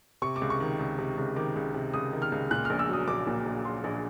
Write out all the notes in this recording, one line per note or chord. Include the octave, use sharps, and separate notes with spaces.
C3 C#6
D6
C#2
C#6
D#3
C#2
C3
C#2
D#3 D6
C#2
C3
C#2 D#6
D#3
F6
C#2
A#2 F#6
F6
A#1
E6
F#3 D#6
A#1 D6
A#2
A#1
F#3 C6
A#1